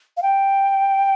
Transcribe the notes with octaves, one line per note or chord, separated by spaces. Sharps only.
F5
G5